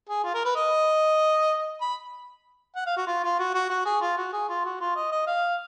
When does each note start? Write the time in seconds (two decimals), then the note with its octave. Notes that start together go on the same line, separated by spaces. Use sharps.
0.09 G#4
0.24 F4
0.34 A#4
0.45 B4
0.56 D#5
1.81 B5
2.76 F#5
2.87 F5
2.97 F#4
3.07 F4
3.24 F4
3.39 F#4
3.55 F#4
3.70 F#4
3.85 G#4
4.02 F4
4.17 F#4
4.33 G#4
4.49 F4
4.65 F#4
4.81 F4
4.96 D#5
5.12 D#5
5.27 F5